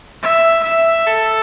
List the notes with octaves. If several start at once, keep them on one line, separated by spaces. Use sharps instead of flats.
E5
E5
A4